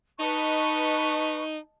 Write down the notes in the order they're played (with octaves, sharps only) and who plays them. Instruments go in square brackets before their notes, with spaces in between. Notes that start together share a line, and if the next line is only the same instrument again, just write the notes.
[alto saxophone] D#4 [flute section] B4 C#6 [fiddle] D#5 A5